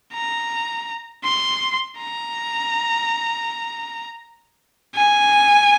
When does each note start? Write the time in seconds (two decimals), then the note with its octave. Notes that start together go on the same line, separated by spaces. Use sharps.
0.13 A#5
1.24 C6
1.99 A#5
4.95 G#5